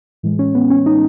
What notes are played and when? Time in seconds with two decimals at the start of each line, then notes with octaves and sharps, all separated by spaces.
0.23 A2 E3 G#3
0.39 C#4
0.55 B3
0.70 C#4
0.86 D#4